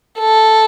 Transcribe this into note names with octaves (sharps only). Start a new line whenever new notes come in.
A4